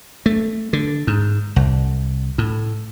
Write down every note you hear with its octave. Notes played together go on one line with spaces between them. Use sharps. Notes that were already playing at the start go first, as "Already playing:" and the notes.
A3
D3
G#2
C2
A2